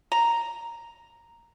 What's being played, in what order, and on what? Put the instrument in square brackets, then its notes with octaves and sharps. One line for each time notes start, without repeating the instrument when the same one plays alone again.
[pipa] A#5